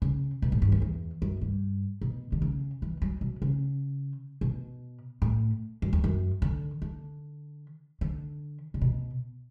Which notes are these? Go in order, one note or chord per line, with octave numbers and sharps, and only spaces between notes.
C#3
B2
A2
G2
F#2
E2
F#2
G2
B2
D3
C#3
E3
F#3
B2
C#3
B2
A2
F#2
E2
F#2
D3
D3
D3
C#3
B2